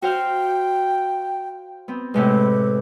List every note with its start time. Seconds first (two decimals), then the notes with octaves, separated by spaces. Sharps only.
0.02 F#4 C5 F5 G5
1.88 B3 C4
2.14 A2 C3 G#3 B4